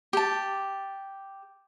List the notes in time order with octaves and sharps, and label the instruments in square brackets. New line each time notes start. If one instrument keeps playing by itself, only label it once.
[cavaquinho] G4 A5